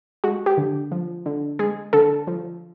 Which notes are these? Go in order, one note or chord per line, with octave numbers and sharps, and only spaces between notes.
G#3 F#4
G4
D3
F3
D3
G#3 G#4
D3 A4
F3